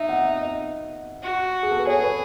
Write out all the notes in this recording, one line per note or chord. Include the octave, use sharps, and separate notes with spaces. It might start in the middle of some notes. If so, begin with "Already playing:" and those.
Already playing: D#4 E5
F#5
E5
D#5
F#4
G#4
A4
B4
G#4 C#5
B4